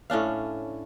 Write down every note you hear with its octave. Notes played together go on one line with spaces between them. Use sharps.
A2 C#4 D4 F5